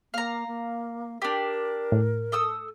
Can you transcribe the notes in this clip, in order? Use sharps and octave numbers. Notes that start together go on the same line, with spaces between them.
A#3 F5 A#5
A#3
D4 G4 A#4
A2
A4 D#6 E6